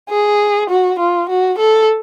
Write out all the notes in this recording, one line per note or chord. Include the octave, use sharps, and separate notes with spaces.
G#4
F#4
F4
F#4
A4